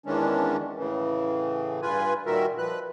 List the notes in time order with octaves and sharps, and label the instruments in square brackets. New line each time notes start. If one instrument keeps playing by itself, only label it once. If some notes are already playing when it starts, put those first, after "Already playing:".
[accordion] E2 D#3 E3 G#3 C#4 D4
A2 C#3 E3
G2 F4 B4 G#5
A#2 D#3 G3 F#4 A#4 E5
F3 B4 F#6